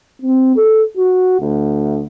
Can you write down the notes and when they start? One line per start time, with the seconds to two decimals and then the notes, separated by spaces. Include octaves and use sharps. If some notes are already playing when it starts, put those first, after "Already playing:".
0.22 C4
0.56 A4
0.97 F#4
1.41 D2